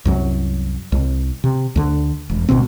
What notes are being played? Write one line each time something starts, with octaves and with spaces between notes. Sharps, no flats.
C2 F#2 F#3
C2
C3
D2 D3
E1
G#1 D2 B2 C4